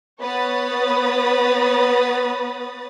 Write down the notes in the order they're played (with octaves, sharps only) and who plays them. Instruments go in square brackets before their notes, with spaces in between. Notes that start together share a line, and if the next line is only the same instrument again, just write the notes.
[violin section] B3 B4 C#5 B5 D#6 A6